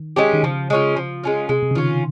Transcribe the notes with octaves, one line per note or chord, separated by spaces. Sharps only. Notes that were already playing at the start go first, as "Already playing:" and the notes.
Already playing: D#3
G#3 C#4 G4
D#3
C#3 F3
G#3 C#4 F4
F3
G#3 C#4 F4
C3 G#3
C3
C#3
D#3 C#4 F4